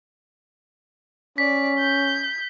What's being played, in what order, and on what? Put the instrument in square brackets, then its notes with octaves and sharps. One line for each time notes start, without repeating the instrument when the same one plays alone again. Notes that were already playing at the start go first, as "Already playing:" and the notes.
[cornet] C#4 [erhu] D5 [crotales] B6
[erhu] G6